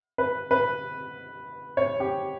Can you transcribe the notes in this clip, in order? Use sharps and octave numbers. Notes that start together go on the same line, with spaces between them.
B4
B4
C#5
G4